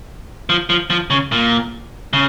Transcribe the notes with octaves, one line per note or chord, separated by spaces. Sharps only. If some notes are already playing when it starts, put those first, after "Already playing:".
F3
F3
F3
C#3
A#2
C#3